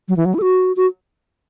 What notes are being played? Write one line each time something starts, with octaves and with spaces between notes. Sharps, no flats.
F#3
E3
F#3
E4
A4
F#4
F#4